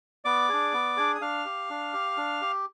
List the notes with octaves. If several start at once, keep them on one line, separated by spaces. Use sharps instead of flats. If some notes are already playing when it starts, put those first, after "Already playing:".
B3 D5 D6
D4 G#4
B3
D4 G#4
D#6
D4 F5 F6
G4
D4
G4
D4
G4